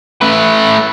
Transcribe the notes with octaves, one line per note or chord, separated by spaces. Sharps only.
A3 B4